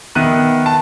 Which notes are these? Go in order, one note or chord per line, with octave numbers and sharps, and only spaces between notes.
D#3 B3 E5 F#6 D#7
A5